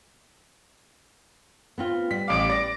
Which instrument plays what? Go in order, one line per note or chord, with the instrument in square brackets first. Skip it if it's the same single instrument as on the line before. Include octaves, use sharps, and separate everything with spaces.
[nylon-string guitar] B3 C4 F4
[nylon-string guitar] G3 [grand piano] B6
[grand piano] A1 F5 [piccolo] D6
[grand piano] D5 A#6